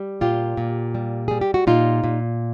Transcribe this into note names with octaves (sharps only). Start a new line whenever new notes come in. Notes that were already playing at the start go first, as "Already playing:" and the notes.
Already playing: G3
A#2 F4 G4
A#2
G3
G3 G#4
G4
F#4
A#2 D#4 F4
A#2